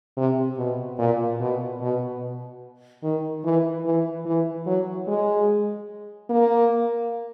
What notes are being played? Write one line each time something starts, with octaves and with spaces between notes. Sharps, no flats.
C3
B2
A#2
B2
B2
D#3
E3
E3
E3
F#3
G#3
A#3